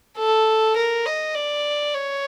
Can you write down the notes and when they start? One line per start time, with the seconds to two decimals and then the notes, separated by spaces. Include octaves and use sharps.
0.17 A4
0.76 A#4
1.06 D#5
1.35 D5
1.94 C#5